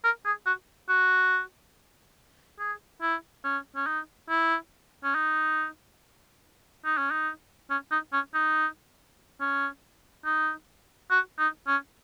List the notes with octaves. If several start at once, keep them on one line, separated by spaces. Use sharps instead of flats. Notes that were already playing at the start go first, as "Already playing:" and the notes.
A#4
G#4
F#4
F#4
G#4
E4
C#4
C#4
D#4
E4
C#4
D#4
D#4
C#4
D#4
C#4
D#4
C#4
D#4
C#4
D#4
F#4
D#4
C#4